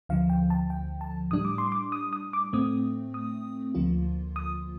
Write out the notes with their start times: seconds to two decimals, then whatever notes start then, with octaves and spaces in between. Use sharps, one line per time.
0.09 D2 D3 F3 F5
0.30 G5
0.50 A5
0.70 G5
1.01 A5
1.31 A2 G3 D4 D#6
1.45 D6
1.58 C6
1.72 D6
1.92 D#6
2.13 D#6
2.33 D6
2.53 A2 A3 C4 D#6
3.14 D#6
3.75 D2 D3 F3 A#3 F4
4.36 D#6